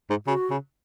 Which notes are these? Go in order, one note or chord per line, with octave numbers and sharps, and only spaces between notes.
G#2
C#3 F#4
C#3